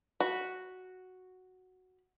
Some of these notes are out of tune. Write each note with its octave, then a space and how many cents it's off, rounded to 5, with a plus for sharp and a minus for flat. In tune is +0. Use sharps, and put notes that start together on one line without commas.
F#4 +0 B5 -10